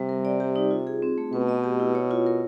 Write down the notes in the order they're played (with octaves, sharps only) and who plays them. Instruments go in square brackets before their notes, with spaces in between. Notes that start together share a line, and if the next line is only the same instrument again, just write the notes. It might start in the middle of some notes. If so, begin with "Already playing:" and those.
Already playing: [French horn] C3 [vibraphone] G3
[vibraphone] A#4
D5
G4
D#4
F4
G#4
C4
A3
[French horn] B2 [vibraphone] B4
[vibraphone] D#5
G4
E4
C#5
F4
A#4